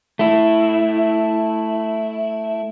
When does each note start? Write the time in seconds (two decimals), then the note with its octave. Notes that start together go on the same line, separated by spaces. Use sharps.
0.19 A3 E4